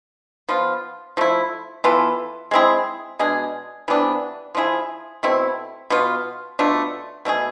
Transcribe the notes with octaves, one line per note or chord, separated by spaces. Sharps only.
F3 B3 F4
F3 A3 E4
E3 B3 F4 A4
G#3 C4 E4 G#4
B2 G#3 D4 G#4
C3 E3 B3 D4
F3 A3 E4 G#4
B2 A3 C4 E4
B2 B3 F4
B2 A3 D4 F4
B2 A3 D4 G#4